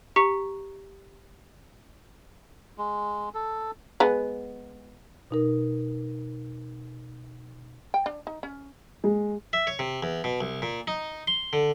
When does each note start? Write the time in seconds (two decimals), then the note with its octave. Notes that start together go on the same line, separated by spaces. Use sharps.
0.16 G4 A#5 C#6 B6 C#7
2.78 G#3
3.34 A4
4.00 G#3 B3
5.31 B2 D#4 A#4
7.94 G5
8.06 D4
8.27 D#4
8.43 C#4
9.04 G#3
9.53 E5
9.67 C#5
9.79 C3
10.03 E2
10.24 B2
10.41 C2
10.62 A#2
10.87 D#4
11.27 C6
11.53 D3